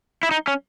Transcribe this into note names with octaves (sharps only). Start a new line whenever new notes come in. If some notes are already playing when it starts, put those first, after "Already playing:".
E4
D#4
C#4